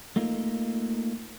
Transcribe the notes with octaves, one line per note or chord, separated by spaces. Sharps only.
A3 A#3 D#4 F4